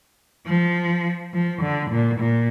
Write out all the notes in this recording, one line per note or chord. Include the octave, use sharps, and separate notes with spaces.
F3
F3
D3
A#2
A#2